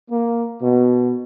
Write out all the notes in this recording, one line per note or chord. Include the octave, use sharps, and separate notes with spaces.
A#3
B2